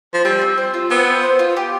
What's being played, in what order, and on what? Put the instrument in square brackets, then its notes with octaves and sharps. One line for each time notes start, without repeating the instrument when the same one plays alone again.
[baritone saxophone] F3
[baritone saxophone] G3 [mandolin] C4
[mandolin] C4
C5
F4
[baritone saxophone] B3 [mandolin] C4
[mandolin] C4
C5
F4
G4